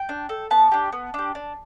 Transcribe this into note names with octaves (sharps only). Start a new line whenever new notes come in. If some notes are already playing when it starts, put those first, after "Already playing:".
Already playing: G5
D4
A4
B3 A5
D4 G4
B3
D4 G4
D4